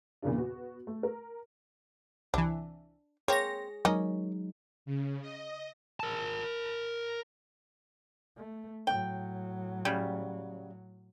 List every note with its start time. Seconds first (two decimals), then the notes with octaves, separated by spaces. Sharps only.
0.22 E2 A#2 C#3 A#3 D4
0.36 B3 F#4
0.87 A3
1.03 A#4
2.34 C2 E3 D4
3.28 A#3 C4 G#4 C#5 A#6
3.85 F#3 G#3 A#3 C#4 D#4 D#5
4.86 C#3
5.22 D#5
6.00 A#4 A5
8.37 A3
8.87 A2 F#3 G5
9.85 C#3 G3